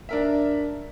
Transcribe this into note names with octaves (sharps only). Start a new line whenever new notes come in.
D4 A#4 E5